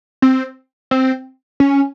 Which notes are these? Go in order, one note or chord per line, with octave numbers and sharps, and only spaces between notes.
C4
C4
C#4